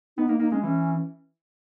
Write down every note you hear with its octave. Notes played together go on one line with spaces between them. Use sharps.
B3 D#4
A#3 D#4
A#3 D#4
G#3 C#4
E3 C#4